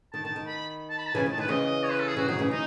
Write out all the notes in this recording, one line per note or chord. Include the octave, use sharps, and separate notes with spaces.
D#3 A5
D#3 A5
D#3
B5
A5
B5
A5
C#3 E3 G#5
D#3
A5
D#3 B4
C#3 E3 D#5
C#5
B4
A4
G#4
C#3 E3 F#4
D#3 F#3 G#4
C#3 E3
D#3 D#4